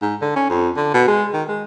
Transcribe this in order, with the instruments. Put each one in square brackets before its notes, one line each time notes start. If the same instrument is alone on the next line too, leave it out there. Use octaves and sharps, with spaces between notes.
[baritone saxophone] G#2
D3
C#4
F2
D3
B2
G#3
D#3
G#3